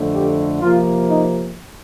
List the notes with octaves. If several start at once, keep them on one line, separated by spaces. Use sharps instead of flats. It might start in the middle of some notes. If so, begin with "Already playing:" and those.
Already playing: F2 D3 A3
G4
C3 F3 A#3 F4
D#4